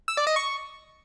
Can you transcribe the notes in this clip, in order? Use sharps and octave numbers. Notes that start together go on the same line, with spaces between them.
E6
D5
D#5
C#6